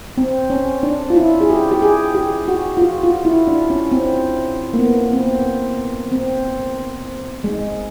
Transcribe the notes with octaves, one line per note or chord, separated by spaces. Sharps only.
C4
C#4
D4
F4
E4
G#4
G4
G4
G#4
G4
F#4
F4
F#4
F4
E4
D4
C#4
C4
A#3
B3
C4
C4
G#3